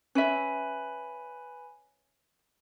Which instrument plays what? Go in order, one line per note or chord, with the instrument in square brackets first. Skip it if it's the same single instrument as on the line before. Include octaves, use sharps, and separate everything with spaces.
[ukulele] C#4 E5 [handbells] B4 G#5 B5